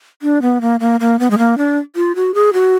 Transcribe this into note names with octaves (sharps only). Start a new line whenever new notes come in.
D4
B3
A#3
A#3
A#3
B3
G#3
A#3
D4
F4
F#4
G#4
F#4